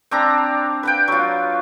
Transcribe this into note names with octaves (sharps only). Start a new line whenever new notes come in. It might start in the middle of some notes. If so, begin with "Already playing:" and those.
C4 D4 A#5
B4 F#5 G5
F#3 F4